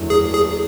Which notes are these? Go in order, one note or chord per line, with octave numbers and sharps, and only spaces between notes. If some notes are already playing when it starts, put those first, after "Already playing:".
Already playing: F#1 E2 D3 F#3 A3
G#4
G#4